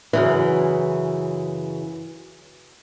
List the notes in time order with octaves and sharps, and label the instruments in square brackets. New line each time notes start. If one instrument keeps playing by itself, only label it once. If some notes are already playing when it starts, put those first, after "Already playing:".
[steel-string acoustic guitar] F#2 C#3 E3